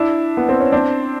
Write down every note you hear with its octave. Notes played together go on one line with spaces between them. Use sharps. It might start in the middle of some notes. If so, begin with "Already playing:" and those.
Already playing: D4 E4
B3
C4
C#4
C4 D4